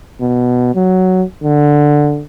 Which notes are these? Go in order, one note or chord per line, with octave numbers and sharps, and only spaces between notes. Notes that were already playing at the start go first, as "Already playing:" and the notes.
B2
F#3
D3